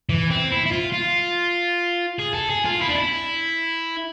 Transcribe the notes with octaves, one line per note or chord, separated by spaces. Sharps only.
E3
C4
E4
E4
F4
F4
G#4
A4
G#4
F4
E4
D4
E4